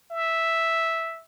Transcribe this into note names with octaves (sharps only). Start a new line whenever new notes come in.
E5